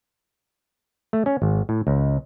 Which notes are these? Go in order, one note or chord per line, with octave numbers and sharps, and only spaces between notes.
A3
C#4
G#1
A2
C#2